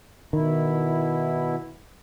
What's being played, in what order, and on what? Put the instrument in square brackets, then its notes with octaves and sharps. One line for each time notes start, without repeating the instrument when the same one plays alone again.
[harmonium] B2 E4 [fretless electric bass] D#3